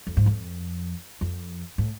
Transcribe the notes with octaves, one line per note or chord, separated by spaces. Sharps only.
F2
G#2
F2
F2
A2